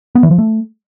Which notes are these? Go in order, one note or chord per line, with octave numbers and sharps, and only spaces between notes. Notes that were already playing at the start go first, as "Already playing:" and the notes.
B3
E3
F3
A3